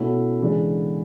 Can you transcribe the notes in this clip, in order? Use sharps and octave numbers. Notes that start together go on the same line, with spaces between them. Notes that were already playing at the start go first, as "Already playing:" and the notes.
Already playing: B2 A3 C#4 E4 A4
C#3 E3 G#3 D4